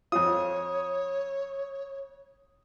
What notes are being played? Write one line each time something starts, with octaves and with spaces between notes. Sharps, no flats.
F2 F4 C#5 D#6